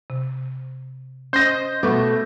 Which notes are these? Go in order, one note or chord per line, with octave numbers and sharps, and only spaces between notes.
C3
C#4 C5 D#5 G6 A#6
B2 A3 B3 C#6 D6